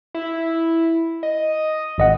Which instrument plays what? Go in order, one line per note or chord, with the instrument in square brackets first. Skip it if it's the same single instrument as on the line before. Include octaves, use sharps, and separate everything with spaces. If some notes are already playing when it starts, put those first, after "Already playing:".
[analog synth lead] E4
D#5
[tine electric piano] G#1 D#5 F#5